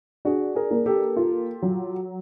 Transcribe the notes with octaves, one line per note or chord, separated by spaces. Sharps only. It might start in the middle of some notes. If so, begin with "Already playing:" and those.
D4 F#4 G#4
G#4 A#4
A#3
G4 A4
F4
F#3